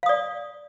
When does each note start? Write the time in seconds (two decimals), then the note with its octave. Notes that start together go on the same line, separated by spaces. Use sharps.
0.03 F5
0.06 D#6
0.09 D5